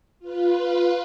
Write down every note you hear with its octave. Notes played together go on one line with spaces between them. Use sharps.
F4 B4